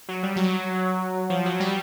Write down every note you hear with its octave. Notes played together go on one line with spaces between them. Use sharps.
F#3
G3
F#3
F3
F#3
G3